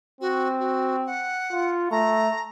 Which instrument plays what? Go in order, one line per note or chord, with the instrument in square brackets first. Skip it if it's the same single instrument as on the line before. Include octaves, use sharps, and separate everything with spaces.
[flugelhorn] C4 [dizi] F#4
[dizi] F#4
F#5
[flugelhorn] F4
[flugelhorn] A3 [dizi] A#5